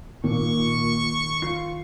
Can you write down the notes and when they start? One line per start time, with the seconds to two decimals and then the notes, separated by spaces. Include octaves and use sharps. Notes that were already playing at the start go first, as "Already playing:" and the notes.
0.24 A#2 D#3 C#6
1.42 F4 C7